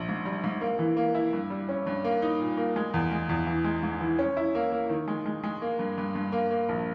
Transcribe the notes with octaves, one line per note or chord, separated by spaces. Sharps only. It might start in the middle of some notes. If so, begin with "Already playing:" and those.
Already playing: A#1
G#2
G3
G#2
A#3
E3
A#3
E4
G2
G3
C#4
G2
A#3
D#4
A#2
A#3
G#3
E2
G#3
E2
E3
G#3
G#2
E3
C#4
E4
A#3
A#3
D#3
G#3
G#3
G#3
A#3
G2
G2
G2
A#3
A#3
A#1